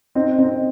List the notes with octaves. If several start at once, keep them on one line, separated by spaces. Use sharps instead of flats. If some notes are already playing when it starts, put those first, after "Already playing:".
C4 D#4
C4 D#4